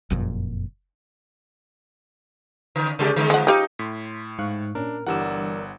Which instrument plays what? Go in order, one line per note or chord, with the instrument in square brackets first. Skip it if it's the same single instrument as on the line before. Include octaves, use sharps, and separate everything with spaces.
[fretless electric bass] F#1 F2 A#2
[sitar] D3
C#3 G#3 G4
D3 G#3
[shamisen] F3 F#5
[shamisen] F3 G4 F5 [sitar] D#4
[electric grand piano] A2 [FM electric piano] C6 B6
[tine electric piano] G#2 [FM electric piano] F5 C#6 F#6
[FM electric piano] A#2 C#4 [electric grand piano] D4 [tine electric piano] A#4
[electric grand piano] G1 F#5 [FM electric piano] E3 G3 D4 [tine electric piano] A#4 D5 E6